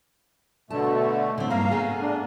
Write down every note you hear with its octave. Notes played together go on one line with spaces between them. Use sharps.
B2 D3 A3 A5
A2 D3 C4
G2 A#3 A#4 F5 A#5
A3 B3 G#4
D4